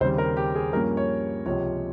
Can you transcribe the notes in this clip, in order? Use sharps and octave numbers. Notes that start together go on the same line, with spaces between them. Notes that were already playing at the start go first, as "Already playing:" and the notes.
D#2 C#3 G3 C4 C5
A#4
G4
G#4
G2 F3 A#3 C#4 A#4
C#5
C#2 C3 F3 G#3 C#5